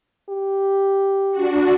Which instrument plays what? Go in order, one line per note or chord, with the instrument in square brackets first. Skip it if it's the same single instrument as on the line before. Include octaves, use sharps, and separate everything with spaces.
[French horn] G4
[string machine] D4 F#4